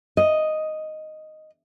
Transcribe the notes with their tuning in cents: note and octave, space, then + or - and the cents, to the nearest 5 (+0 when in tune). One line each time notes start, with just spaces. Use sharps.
D#5 +0